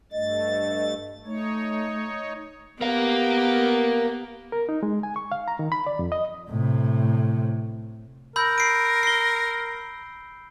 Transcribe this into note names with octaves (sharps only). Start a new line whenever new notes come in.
G2 A3 D#5 A6
A3 D#4 C#5
B3 G4 A#4 F5
A#4
D#4
G#3
G#5
C#6
F5
A#5
D#3
B5
D5
F2
D#5
A2 C3
A#4 B5 E6 G6
C7 D7
C7 G7